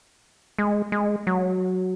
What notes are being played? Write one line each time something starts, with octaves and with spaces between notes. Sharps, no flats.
G#3
G#3
F#3